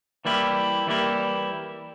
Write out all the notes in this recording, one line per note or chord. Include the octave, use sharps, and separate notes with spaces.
E3 G3 A#3 E4 G4
E3 G3 A#3 E4 G4